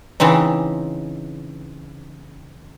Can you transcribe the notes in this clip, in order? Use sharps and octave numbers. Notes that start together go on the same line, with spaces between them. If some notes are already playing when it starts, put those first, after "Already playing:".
C#3 E3 C4 D#4